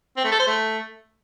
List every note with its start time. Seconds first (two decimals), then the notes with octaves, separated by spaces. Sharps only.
0.17 C4
0.24 A3
0.32 A4
0.39 C5
0.47 A3